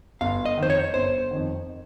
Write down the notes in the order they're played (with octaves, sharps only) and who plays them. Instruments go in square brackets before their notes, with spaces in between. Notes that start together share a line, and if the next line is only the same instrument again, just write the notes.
[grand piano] G1 [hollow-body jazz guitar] F5
[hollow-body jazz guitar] D#5
[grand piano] F2 D#3 [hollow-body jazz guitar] C5
[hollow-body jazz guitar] C#5
[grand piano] G1 [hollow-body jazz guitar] C5
[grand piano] F2 D#3